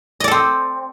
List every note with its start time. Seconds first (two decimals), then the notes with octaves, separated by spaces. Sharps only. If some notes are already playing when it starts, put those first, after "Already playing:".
0.20 D#5
0.24 D5
0.28 A4
0.31 C4